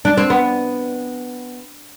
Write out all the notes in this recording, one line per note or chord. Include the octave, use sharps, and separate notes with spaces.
D4
C4
B3